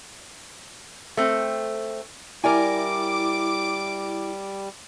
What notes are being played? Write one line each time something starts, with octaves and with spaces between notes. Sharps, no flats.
A3 C4
G3 E4 A#4 D5 G#5 D6